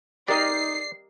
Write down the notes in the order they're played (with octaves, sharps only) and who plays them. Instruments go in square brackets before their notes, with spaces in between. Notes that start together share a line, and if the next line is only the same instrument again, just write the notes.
[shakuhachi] D#4 [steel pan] G4 A#4 D#5 [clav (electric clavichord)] D5 [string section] C7